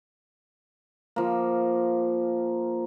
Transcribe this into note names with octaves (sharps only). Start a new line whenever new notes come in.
F3 A#3